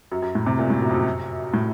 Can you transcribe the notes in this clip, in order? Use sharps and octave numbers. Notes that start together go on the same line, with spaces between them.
F#2
F#2
A2
C3
A#2
A2
F#2
F2
F#2
A2